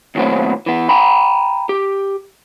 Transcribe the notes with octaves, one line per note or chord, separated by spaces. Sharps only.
D#2 A2 F#3 B3 C4
E3 B3
G5 A#5 B5
G4